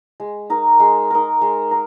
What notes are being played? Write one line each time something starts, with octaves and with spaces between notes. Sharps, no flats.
G#3
D#4 A#4
G#3
D#4 A#4
G#3
A#4